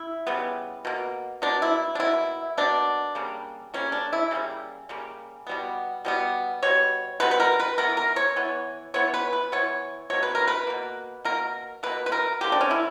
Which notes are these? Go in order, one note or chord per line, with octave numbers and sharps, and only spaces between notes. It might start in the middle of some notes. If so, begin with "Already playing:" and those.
Already playing: E4
C#3 G3 B3
B2 A#3
B2 A#3 D4
E4
D4
B2 A#3 E4
B2 A#3 D4
C#3 G3 A#3
C#3 G3 A#3 C#4
D4
E4
C#3 G3 A#3
C#3 G3 A#3
B2 G3 B3
B2 G3 B3
B2 G3 C#5
B2 G3 B3 B4
B4
A#4
B4
E3 B3 A#4
A#4
C#5
E3 B3
E3 B3 C#5
B4
B4
E3 B3 C#5
B2 A#3 C#5
B4
A#4
B4
B2 A#3
B2 A#3 A#4
B2 A#3 B4
B4
A#4
D3 A#3 G4
D4
C#4
E4